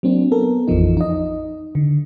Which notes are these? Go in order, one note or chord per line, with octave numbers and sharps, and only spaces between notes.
F#3 A#3 C4 D4
B3 A4 A#4
A1 F2 E3 F3 D#4
D#4 D#5
D3